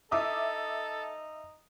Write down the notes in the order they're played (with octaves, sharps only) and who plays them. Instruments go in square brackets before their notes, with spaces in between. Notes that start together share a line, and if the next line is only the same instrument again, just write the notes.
[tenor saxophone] D#4 [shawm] A4 [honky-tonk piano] E5 D6 D#6